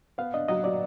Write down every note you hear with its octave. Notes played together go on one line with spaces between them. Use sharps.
B3 F5
D4 D#5
F#3 D#5
F#3 D5